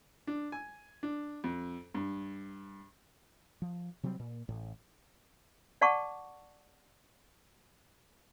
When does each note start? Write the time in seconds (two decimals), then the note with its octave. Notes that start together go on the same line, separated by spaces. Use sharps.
0.27 D4
0.52 G#5
1.03 D4
1.44 F2
1.94 G2
3.62 F3
4.03 C3 F#3 G3 C4
4.20 A#2
4.49 A1 A2
5.81 D5 F#5 A5 C#6 D6